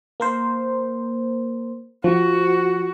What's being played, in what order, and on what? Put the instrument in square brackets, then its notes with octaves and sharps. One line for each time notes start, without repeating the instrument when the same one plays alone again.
[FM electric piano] A#3 A#4 C5
[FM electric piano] F3 [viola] F#4